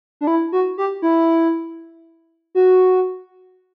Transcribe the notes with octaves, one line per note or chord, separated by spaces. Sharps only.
D4
E4
F#4
G4
E4
F#4